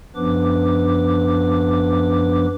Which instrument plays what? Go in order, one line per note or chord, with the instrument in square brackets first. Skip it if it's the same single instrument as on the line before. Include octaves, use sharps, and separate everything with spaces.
[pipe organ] F#2 F3 B3 D4 B4 D6